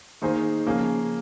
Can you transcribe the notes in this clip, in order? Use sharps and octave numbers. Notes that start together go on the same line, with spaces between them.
D#3 A#3 D#4 G#4 C5
C#3 F3 A#3 C#4 G#4